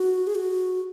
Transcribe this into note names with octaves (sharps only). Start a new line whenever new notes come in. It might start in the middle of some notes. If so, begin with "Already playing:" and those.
Already playing: F#4
G#4
F#4